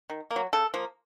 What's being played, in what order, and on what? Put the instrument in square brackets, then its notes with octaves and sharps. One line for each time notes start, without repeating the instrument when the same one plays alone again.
[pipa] D#3
A#3
F#3
C#3 A4
F3 A#3